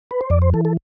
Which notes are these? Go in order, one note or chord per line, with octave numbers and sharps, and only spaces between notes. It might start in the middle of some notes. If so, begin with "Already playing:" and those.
B4
C5
F2 D5
C5
E3 A4
A4